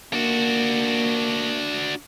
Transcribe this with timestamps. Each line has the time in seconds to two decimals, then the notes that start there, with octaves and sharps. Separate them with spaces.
0.13 A#3 D4 F#4